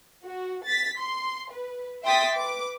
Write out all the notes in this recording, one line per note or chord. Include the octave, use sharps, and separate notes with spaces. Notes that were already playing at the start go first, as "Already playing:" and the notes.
F#4
A6 B6
C6
B4
E5 G5 C6 D#6 A6 B6
B4 D6